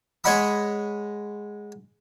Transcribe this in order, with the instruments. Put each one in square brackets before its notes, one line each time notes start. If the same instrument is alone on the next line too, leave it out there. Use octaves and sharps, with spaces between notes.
[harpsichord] G#3 C#5 D#5 F#5 B5 D#6